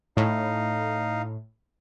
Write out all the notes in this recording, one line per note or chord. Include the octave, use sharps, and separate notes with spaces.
A2 D#4 F5